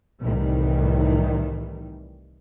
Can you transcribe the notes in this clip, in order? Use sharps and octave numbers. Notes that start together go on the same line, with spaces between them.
C2 A2 D#3 E3 G3